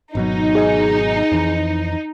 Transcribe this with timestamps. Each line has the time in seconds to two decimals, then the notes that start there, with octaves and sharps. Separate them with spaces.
0.15 G#1 B2 F#3 D#4
0.55 G#4 D#5 G#5
1.32 F2 E3